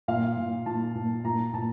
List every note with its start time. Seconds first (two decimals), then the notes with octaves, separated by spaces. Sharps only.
0.08 A#2 F5
0.37 A#2
0.66 A#2 A5
0.95 A#2
1.24 A#2 A#5
1.53 A#2 A5